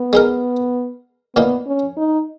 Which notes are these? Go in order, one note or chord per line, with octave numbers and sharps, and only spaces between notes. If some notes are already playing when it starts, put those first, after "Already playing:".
Already playing: B3
G#3 D#4 A#4
A#2 A#3 B3 D#4
C#4
D#4